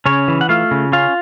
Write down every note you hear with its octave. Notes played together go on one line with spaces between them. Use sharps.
C#3 C#4 C#5
E3
F#5
A3 F4 F5
C#3
C#4 F4 F5